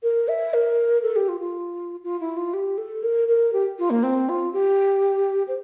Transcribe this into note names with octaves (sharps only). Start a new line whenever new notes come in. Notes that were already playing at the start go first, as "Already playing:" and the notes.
A#4
E5
A#4
A4
G4
F4
F4
F4
E4
F4
G4
A4
A#4
A#4
G4
F4
A#3
C4
F4
G4
C5